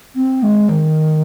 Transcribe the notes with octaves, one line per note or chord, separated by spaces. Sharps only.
C4
G#3
D#3